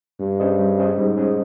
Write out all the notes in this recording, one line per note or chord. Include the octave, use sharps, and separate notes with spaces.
G2 G3
C#4 G#4 C5 D#5
G3
C#4 G#4 C5 D#5
G#2 G3
C#4 G#4 C5 D#5